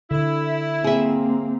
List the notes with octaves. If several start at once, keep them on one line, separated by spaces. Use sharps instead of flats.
D3 E4
A#3 C4 G#4 E5